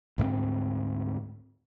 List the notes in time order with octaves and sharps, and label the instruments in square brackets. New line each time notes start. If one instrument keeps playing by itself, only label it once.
[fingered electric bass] D2 G#2 A3 C4